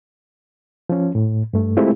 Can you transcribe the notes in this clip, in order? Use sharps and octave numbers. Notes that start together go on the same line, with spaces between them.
F3 C#4
A2
G2 A3
G#3 A3 C4 E4 F4 G4